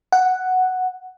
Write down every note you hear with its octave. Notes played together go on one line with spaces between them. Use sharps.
F#5